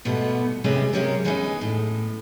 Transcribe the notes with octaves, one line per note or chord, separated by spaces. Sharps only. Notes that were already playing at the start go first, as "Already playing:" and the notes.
G#2 B2 G3 A3 B3
C3 E3 G#3 B3 C#4 G4
C3 F#3 G#3 C#4 G4 A#4
E3 G3 G#3 B3 C#4 D#4
A2